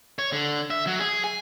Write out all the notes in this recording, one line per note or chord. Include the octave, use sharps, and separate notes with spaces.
C#5
D3
E5
F#3
G#4
G#5